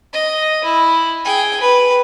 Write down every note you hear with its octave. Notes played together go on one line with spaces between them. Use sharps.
D#5
E4
G#4 G5
B4